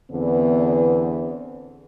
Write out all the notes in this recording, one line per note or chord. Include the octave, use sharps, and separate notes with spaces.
E2 D3 B3 C4